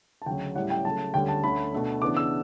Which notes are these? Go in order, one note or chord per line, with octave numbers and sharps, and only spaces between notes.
A5
D2 C#3 F#3 G5
A2 G3 C#4 F#5
G5
C#3 F#3 A3 A5
D2 D3 G3 C#4 G5
A5
D2 D3 A3 C#4 B5
B2 A3 D4
C#3 E3 B3 D4 D6
E6